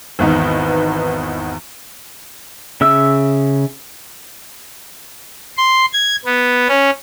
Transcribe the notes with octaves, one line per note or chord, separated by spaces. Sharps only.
G#1 E2 B3 D#4
C#3 E5 E6
C6
G#6
B3
C#4